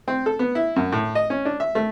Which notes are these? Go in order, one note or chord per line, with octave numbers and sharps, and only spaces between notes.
C4
A4
B3
E4
F#2
A2
D#5
C#4
D4
E5
A3